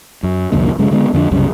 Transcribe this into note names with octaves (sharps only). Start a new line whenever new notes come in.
F#2
C2 F2 D3 A#3
F#2 C#3 G#3
D3 G#3 B3
F2 D3 A#3 D4
C2 F#2 C#3 G3